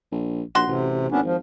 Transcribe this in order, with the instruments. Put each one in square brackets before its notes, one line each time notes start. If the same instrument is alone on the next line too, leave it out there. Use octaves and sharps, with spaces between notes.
[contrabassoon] A#1
[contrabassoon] A#1 [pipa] F#4 C6
[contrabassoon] A1 [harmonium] C3
[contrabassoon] G#1 [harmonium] B3 C#4 D4
[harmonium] F3